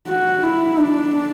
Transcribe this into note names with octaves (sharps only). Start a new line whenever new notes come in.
F#4
E4
D4